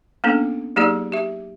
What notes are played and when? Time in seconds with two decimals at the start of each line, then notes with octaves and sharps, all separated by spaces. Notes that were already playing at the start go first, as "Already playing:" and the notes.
0.24 A#3 B3 C#4 D4 A4
0.76 F#3 A#3 D#4 G4 G#4 D5
1.12 G4 E5